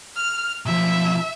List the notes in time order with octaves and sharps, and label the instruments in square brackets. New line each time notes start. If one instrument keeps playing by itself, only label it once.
[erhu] F6
[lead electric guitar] B1 F3 [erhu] E5